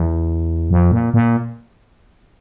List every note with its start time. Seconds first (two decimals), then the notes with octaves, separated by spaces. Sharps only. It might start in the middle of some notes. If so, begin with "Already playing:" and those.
Already playing: E2
0.71 F2
0.92 A#2
1.14 A#2